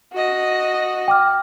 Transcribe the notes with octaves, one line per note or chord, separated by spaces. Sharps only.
F#4 D#5
G5 D6 F6